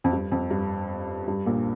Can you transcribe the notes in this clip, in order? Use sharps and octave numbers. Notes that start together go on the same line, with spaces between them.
F2
G2
F2
G2
G2
A#1 A#2